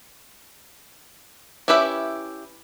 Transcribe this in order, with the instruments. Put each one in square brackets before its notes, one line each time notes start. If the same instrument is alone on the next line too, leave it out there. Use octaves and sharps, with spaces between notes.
[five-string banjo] C#4 E4 G4 B4 E5